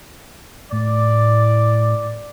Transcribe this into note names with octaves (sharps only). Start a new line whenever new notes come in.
A2 D5